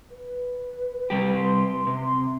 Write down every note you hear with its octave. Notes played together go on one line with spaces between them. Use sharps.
B4
C3 G3 G4
C6
C3